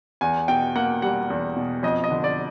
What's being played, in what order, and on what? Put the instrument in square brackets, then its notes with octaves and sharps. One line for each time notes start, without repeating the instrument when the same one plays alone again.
[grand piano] E2 G#5
B2 G5
A#3 F#5
G3 F#5
E2
B2
F2 D#5
D#5
D3
D5